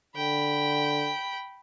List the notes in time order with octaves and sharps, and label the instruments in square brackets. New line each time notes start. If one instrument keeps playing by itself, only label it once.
[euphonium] D3 [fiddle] G5 B5